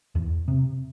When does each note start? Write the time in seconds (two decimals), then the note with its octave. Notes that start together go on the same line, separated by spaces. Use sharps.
0.15 E2
0.48 C3